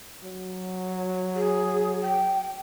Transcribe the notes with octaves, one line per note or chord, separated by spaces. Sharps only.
F#3
G#4
G5